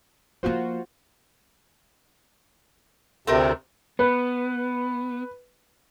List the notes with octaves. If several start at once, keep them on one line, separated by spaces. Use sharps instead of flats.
F3 A#3 F4 F#4 C5
D2 C3 A3 C4 A#4
B3 B4